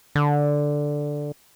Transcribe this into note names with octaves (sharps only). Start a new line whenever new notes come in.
D3